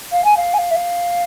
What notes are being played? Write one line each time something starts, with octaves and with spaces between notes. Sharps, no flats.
F5
G#5
F5
G#5
F5
E5
F5